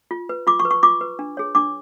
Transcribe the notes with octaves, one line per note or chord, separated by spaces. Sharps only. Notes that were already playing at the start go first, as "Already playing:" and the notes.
F4
B4
F4 D6
C#6
B4
C#6
F4 D6
B4
D4
G#4 C#5
D4 D6